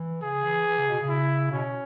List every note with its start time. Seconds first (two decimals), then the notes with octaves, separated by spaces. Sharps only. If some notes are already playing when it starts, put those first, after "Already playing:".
Already playing: E3
0.23 C#3 G#4
0.44 E3
0.66 E3
0.78 C#3
0.89 B2
1.02 C#3
1.09 E4
1.51 B2 C#4